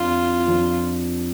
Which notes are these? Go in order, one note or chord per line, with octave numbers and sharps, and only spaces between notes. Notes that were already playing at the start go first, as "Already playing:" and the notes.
Already playing: F2 F3 D4 F4
F2 F3 D4